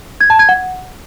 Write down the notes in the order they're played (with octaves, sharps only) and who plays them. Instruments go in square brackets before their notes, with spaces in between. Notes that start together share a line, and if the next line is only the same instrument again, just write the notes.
[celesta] G#6
A5
G#6
F#5